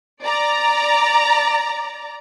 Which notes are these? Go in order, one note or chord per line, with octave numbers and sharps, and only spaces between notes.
D5 A#5